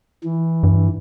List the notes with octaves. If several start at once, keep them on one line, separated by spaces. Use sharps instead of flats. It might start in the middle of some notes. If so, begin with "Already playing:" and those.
E3
G2